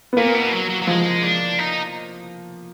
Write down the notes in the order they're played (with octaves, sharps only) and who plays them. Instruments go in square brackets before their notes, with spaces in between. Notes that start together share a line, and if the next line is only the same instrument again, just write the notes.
[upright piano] B3
[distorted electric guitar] A#2 [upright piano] A#3
[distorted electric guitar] B2
F#3
F#3
F#3
[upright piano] F3 [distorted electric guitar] G#3
[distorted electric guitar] D4
D#4